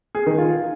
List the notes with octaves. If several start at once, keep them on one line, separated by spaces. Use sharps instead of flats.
G#4
D#3
F4